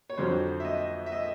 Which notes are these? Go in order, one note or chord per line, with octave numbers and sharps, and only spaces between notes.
C#5
F2 D3 F#3 C5
E5
D#5
E5
D#5